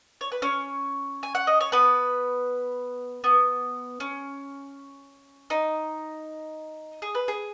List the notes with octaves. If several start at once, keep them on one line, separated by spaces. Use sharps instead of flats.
C#5
B4
C#4 C#5
G#5
F#5
D#5
C#5
B3 B4
B3
C#4
D#4
G#4
B4
G#4